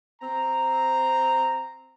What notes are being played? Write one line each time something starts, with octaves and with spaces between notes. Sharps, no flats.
C4 A#5